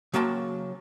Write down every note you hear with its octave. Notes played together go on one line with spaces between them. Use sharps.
C#3 F#3 A#3 G5 A5 C6